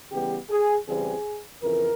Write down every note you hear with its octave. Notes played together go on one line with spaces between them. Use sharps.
C#3 E3 G3 B3 G4
G#4
E2 C#3 E3 G3 C4 G#4
F2 C#3 E3 A#4